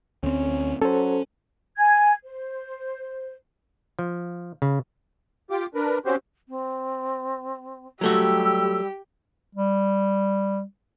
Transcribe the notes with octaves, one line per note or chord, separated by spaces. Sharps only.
D2 C4 C#4
F#3 C#4 A4 C5
G#5 G#6
C5
F3
C#3
F4 G4 D6
D4 A#4 B4
C4 C#4 F#4 G4 C5
C4
F#3 G3 A3 F#4 G4 E6
G3